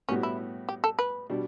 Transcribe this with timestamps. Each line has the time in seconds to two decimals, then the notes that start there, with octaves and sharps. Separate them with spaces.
0.09 A2 G3 B3 C#4 F#4
0.23 E4
0.69 G4
0.84 A4
0.99 B4
1.30 B2 G3 D4